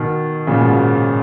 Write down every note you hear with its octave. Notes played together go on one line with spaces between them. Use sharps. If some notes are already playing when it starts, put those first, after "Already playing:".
Already playing: B2 D#3
A#2 C#3
G#2 B2